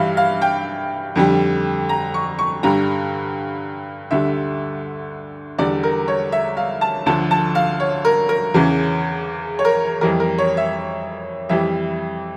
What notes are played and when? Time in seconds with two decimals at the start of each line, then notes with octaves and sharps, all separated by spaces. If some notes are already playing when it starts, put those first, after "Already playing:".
Already playing: G2 E3 G3 E5 F5
0.17 F5
0.42 G5
1.15 F2 D3 G3
1.89 A#5
2.14 C#6
2.39 C#6
2.63 G2 D3 G3 A#5
4.11 D2 D3 G3 E5
5.58 E2 D3 G3 D5
5.83 A#4
6.08 C#5
6.32 E5
6.57 F5
6.81 A5
7.06 D2 D3 F3 A5
7.31 A5
7.55 F5
7.80 C#5
8.05 A#4
8.29 A#4
8.54 E2 C#3 E3
9.59 C#5
9.65 A#4
10.01 F2 E3 G3 A#4
10.20 A#4
10.38 C#5
10.57 E5
11.49 F2 E3 G3 E5